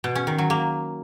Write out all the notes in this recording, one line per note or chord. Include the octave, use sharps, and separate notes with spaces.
B2
C#4
D#3
F#3
A#3